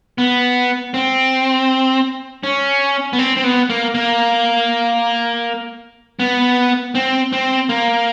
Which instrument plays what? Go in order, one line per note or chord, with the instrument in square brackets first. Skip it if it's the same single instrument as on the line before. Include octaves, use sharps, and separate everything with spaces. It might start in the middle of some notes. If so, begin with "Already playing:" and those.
[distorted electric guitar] B3
C4
C#4
B3
C4
C4
B3
A#3
A#3
B3
C4
C4
A#3